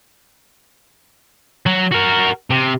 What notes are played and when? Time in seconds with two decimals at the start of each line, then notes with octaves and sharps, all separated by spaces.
1.66 F#3
1.91 F#4 A#4
2.50 C3